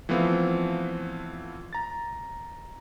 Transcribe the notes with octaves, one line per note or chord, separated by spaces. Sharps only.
E3 F3 A3 B3 C4 F4
A#5 A6